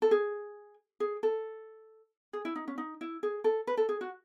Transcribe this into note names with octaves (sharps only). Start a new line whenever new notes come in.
A4
G#4
G#4
A4
G#4
E4
D#4
C#4
D#4
E4
G#4
A4
B4
A4
G#4
F#4